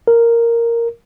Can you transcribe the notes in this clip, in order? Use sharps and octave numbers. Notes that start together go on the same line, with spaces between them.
A#4